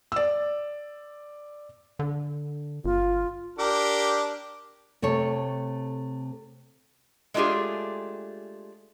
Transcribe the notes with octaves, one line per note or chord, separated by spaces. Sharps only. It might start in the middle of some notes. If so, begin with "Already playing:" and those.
D5 E6
D3
G1 F4
D4 G4 A#4
C3 A3 A4 C#5
G#3 A3 D4 F4 G4 G#4